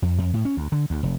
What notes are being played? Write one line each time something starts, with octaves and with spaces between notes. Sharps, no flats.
F2
F2
A2
C#4
D2
D3
D2
F1